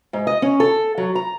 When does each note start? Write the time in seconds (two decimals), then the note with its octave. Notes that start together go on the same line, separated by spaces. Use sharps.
0.13 G#2
0.27 D#5
0.42 C#4
0.60 A4
0.98 F#3
1.15 A#5